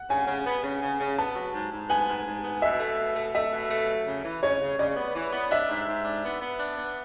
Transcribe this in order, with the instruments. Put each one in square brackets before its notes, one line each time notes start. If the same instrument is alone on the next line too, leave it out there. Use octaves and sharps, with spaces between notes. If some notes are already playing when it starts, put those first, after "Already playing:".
Already playing: [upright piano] F#5
[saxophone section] C#3 [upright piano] G#5
[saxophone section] C#3
B3
C#3
C#3
C#3
[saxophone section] B3 [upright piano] A5
[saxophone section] F#3
G#2
G#2
[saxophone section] B3 [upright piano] G#5
[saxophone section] G#2
G#2
B3
[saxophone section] B2 [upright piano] E5
[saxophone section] A3
B2
A3
[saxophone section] A3 [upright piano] E5
[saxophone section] B2
A3
F#3
C#3
E3
[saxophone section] C#3 [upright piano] C#5
[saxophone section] C#3
[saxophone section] C#3 [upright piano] D5
[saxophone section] B3
E3
B3
[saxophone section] D4 [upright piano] E5
[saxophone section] G#2
G#2
D4
B3
B3
D4
B3